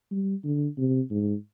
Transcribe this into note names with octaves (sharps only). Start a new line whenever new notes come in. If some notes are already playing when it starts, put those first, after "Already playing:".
G3
D3
C3
G#2